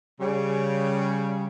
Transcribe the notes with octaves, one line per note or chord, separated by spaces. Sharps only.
C#3 G3